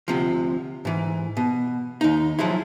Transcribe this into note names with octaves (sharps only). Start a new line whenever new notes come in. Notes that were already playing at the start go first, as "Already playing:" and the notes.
D2 C3 F3
G#2 E3
B2
D#2 D#4
F3 F#3 G#3 E4